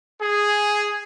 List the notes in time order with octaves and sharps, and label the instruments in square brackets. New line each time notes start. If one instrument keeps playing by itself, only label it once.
[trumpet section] G#4